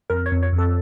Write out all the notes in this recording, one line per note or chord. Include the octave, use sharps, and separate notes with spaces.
F2 A#4
C#5
F2
C#5
F2
A4